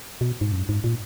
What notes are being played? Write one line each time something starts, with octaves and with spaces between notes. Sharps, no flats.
B2
G#2
F#2
G#2
A#2